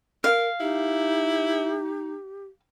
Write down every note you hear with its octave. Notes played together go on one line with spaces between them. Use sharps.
A#4 F5
D#4 E4 G4